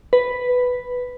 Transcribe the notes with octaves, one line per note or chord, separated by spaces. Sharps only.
B4